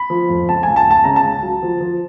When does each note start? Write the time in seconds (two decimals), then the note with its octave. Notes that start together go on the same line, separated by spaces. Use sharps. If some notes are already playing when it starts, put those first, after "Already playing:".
Already playing: B5
0.10 F3
0.29 F2
0.49 C#2 A5
0.63 C#2 G#5
0.76 A5
0.87 C#2 A5
1.04 C#3 A#5
1.16 A5
1.24 C#2
1.43 F#3
1.63 F3
1.81 F3